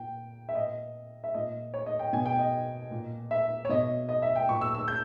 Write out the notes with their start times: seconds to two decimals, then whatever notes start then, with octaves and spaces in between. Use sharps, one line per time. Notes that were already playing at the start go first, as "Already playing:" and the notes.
Already playing: A#2 G5
0.49 E5
0.55 A#2 D#5
1.24 E5
1.34 A#2 D#5
1.74 C#5
1.86 D#5
1.99 G5
2.13 B2 G#5
2.26 G5
2.39 D#5
2.91 A#2
3.31 E5
3.65 C#5
3.69 B2 D#5
4.09 D#5
4.22 E5
4.36 G5
4.49 A#2 C#6
4.61 E6
4.74 E6
4.88 G6